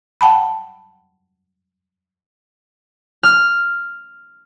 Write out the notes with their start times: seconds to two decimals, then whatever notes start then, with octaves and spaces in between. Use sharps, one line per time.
0.21 F#5 G5 A5 B5
3.23 F6